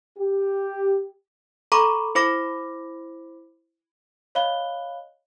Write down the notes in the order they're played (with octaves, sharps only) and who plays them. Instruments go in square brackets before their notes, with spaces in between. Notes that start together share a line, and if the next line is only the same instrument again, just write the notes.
[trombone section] G4
[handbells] A4 A#5 B5 C#6 D6
E4 C5 B5 D6 A#6
[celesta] C#5 D#5 F5 B5 F#6 G7